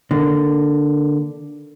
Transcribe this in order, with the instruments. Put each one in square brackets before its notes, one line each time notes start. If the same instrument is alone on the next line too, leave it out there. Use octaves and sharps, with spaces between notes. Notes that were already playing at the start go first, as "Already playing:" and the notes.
[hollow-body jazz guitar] D3 A#3